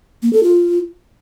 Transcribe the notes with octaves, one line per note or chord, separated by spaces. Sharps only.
A#3
A4
F4